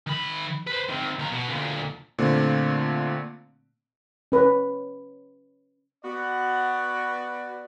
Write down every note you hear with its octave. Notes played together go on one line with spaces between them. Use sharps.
D#3 B5
B4 C5
D#3 C4
D#2 A#4
B2
D2 A#2
A#2 D3 A3 C4
C#4 B4
B3 F#4 D5